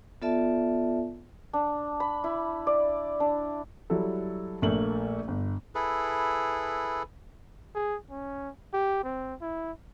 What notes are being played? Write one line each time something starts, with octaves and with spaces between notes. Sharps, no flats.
B3 F4 A4 D5 E5 A5
D4
B5
E4
D5
D4
F#3 G3 E4 A4
A#1 A3 A#3 F#7
G1
E4 G#4 A4 B4
G#4
C#4
G4
C4
E4